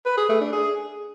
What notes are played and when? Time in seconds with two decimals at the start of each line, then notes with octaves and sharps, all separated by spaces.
0.06 B4
0.17 G#4
0.29 A3
0.41 D4
0.53 G#4